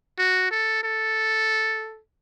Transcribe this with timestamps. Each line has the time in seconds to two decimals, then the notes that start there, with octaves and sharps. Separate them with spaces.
0.18 F#4
0.51 A4
0.83 A4